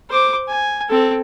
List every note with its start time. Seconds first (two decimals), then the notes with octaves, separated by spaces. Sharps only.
0.10 C5 D6
0.48 G#5
0.89 C4 A4